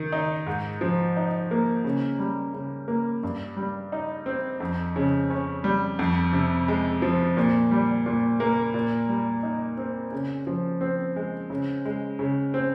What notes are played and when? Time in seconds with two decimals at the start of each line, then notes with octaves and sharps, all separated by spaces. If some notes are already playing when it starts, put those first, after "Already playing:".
Already playing: D#3
0.12 D#4
0.46 G#2
0.81 F3
1.17 D#4
1.51 A#3
1.84 C#3
2.19 G3
2.54 C#3
2.88 A#3
3.23 G2
3.57 G3
3.92 D#4
4.26 C4
4.60 F2
4.96 C#3
5.30 C#4
5.64 G3
5.99 F2
6.33 C3
6.68 G#3
7.02 F3
7.37 A#2
7.71 G3
8.06 A#2
8.40 A#3
8.74 A#2
9.08 G3
9.43 D#4
9.77 C4
10.12 C#3
10.47 F3
10.81 C4
11.16 G#3
11.50 C#3
11.85 G#3
12.19 C#3
12.54 C4